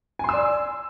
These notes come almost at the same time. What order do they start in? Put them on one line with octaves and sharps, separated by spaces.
G#5 C6 E6 D5